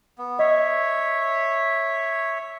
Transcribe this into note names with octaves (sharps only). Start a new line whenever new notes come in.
B3
C#5 D#5 E5